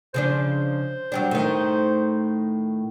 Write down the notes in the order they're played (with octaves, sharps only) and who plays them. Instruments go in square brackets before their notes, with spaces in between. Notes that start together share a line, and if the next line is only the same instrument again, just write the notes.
[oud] C#3 F3 D4 [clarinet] C5
[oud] F#3 G3 D4
A2 D#3